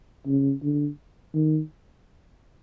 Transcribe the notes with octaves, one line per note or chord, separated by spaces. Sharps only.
C#3
D3
D#3